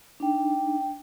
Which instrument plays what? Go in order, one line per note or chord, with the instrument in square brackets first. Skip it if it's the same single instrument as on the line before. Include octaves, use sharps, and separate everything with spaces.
[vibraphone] D4 D#4 G5